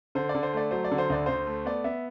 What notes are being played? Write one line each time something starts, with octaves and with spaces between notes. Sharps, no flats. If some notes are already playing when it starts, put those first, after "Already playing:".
D3 C5
D5
D3
C5
A3 D5
F#3 C5
D5
D3
C5
D2 D5
D2 C5
A3
B3 D5
B3 E5